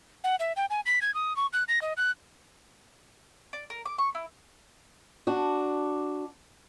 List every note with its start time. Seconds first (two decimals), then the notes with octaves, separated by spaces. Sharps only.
0.24 F#5
0.39 E5
0.56 G5
0.70 G#5
0.86 B6
1.02 G#6
1.14 D#6
1.36 C#6
1.53 F#6
1.68 A#6
1.82 D#5
1.97 F#6
3.53 D5
3.70 A#4
3.85 D6
3.98 C#6
4.15 E4
5.27 D4 F#4